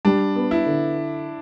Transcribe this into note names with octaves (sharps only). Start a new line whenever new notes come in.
G3 D4
B3
E4
D3